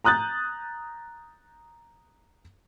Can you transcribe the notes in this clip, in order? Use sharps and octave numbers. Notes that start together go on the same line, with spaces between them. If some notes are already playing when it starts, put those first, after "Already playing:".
A#5 D#6 F#6 G6 A6